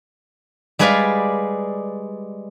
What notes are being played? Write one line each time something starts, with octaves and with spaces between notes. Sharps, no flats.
G3 G#3 G#4 B4 D5 F5